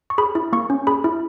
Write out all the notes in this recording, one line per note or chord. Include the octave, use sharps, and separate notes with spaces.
C#6
G#4 B5
E4
A#3 C#6
C#4
G#4 B5
E4